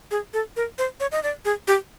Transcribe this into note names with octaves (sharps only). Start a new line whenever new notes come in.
G#4
A4
A#4
C5
C#5
D#5
D5
G#4
G4